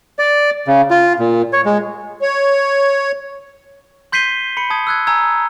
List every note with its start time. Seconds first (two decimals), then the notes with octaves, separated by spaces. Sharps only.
0.19 D5
0.68 C#3
0.91 F4
1.19 A#2
1.53 C#5
1.66 G#3
2.22 C#5
4.12 C6 G6 B6 C7 D#7 G7
4.57 B5 C#7
4.70 A5 D#6 G#6
4.87 E6 F#6 G#6
5.07 G#5 A#5 E6 G#6